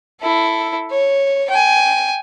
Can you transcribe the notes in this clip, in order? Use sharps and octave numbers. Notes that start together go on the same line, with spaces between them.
E4 A4
C#5
G5 G#5